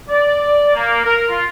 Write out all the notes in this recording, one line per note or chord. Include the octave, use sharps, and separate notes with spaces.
D5
A#3
A#4
F4